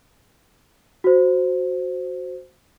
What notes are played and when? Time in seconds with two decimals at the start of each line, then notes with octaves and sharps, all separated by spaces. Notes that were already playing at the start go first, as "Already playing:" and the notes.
1.04 F#4 C5